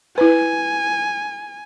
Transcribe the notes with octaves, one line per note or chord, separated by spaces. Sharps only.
E4 B4 G#5